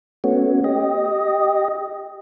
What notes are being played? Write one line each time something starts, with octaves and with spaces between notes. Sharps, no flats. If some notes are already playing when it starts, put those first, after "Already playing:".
A3 B3 C#4 F#4
G4 D#5